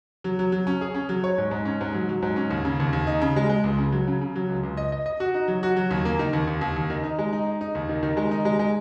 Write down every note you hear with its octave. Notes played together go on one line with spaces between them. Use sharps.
F#3
F#3
F#3
C#4
G#4
C#4
F#3
C#5
G#2
G#2
C#4
G#2
F#3
F#3
G#2
C#4
D#2
C#3
D#2
D#2
D#4
C#3
G#3
G#3
C#2
C#3
F#3
C#3
C#3
F#3
C#2
C#2
D#5
D#5
D#5
F#4
D#4
F#3
F#4
F#3
D#2
A#3
D#3
D#2
D#2
D#2
D#2
D#3
D#4
G#3
D#4
D#4
D#4
D#2
D#3
D#3
G#3
D#4
G#3
G#3